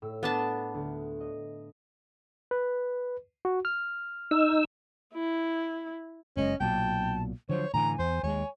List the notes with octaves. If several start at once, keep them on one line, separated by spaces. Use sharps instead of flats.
A2 E6
B3 D4 A5
D2
D#5
B4
F#4
F6
D#4 E6
E4
F#1 G#3 C#4 D#5
B1 A#2 F#3 G5 A5
D3 F3 F#3 C5 C#5
A2 D3 E3 G#5 A#5
E2 C5
D#2 G3 G#3 C#5